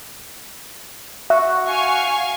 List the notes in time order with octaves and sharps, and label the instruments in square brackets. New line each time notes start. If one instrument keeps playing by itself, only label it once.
[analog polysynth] F#4 [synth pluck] E5
[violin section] F5 G#5 C#6